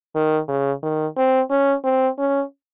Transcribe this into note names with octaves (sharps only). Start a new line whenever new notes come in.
D#3
C#3
D#3
C4
C#4
C4
C#4